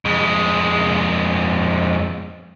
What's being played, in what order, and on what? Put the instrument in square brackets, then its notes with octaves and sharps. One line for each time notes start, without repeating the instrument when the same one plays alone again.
[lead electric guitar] F2 G#3